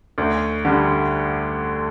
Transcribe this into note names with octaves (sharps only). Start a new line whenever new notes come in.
D2
D3 G3